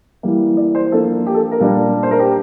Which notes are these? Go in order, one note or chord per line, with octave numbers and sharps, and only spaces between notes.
E3 G3 A#3
D5
C5
F3 A#3 D4 A4
G4
A4
A#4
A#2 G3 A#3 D4
C5
A#4
G4